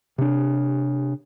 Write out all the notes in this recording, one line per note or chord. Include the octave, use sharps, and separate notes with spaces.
C3 D4